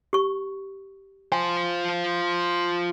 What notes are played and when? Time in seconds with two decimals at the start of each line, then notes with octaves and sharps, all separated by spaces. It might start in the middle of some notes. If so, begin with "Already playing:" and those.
0.13 G4 C#6
1.32 F4 C5 G#5